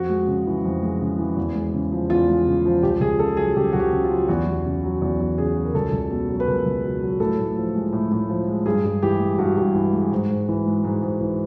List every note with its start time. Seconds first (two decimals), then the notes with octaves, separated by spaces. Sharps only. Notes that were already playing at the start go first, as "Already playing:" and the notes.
Already playing: F2 F#4
0.09 G#3
0.27 C#3
0.47 E3
0.64 F2
0.83 G#3
1.01 C#3
1.19 E3
1.37 E2
1.55 G#3
1.74 C#3
1.92 F3
2.10 E2 F4
2.29 G#3
2.46 C#3
2.65 F3
2.83 C#2 G4
3.00 C#2 G#4
3.19 C#3 A4
3.37 F#3 G#4
3.56 C#2 G4
3.73 C#2 F#4
3.79 G4
3.92 C#3
4.04 F4
4.11 F#3
4.28 E2 F#4
4.46 E2
4.66 C#3
4.84 F#3
5.02 E2
5.20 E2
5.38 C#3 G#4
5.55 F#3
5.65 A#4
5.74 C#2 A4
5.92 C#2
6.10 B2
6.29 F#3
6.40 B4
6.47 C#2 A#4
6.66 C#2
6.84 B2
7.02 F#3
7.20 A2 A4
7.38 A2
7.57 F3
7.75 G#3
7.92 A2
8.12 A2
8.29 F3
8.47 G#3
8.66 G2 G#4
8.84 G2
9.03 E3 G4
9.20 G#3
9.38 G2 F#4
9.57 G2
9.74 E3
9.93 G#3
10.12 G#2
10.30 G#2
10.48 E3
10.66 G#3
10.84 G#2
11.02 G#2
11.21 E3